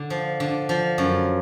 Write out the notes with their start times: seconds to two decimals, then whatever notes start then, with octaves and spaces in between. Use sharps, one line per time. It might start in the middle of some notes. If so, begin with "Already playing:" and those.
Already playing: D3
0.10 F3
0.40 D3
0.69 F3
0.98 F#2